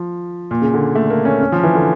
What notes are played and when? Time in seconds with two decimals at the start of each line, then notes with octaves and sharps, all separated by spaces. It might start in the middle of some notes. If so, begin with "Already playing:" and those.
Already playing: F3
0.51 A#2
0.62 C#3
0.74 D3
0.95 A3
1.10 A#3
1.25 C#4
1.40 C#4
1.52 F3
1.63 E3
1.75 D3